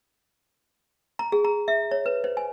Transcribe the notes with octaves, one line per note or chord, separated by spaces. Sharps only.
A#5
G#4
A#5
E5
C#5
B4
C5
G#5